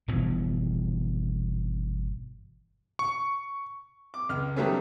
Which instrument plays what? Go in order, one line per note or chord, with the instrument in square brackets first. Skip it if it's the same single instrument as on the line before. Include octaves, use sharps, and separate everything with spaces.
[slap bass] G1 B2 E3 F3
[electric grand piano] C#6
[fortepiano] D6
C#2 F6
D#3 F#3 G3 A3 B3 C#4